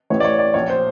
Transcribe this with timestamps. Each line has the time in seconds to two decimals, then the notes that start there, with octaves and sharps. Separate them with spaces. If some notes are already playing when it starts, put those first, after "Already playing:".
0.10 A1 A2 E3 C#5
0.20 D5
0.25 C#5
0.39 D5
0.54 A#1 A#2 C#5
0.70 C5